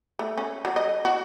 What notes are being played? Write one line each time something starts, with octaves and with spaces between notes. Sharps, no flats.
A3
C#4
F#3
D#5
F#4